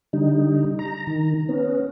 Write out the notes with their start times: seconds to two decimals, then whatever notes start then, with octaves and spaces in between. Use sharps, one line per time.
0.13 D3 G3 D#4
0.79 A#5
1.07 D#3
1.49 B3 C#4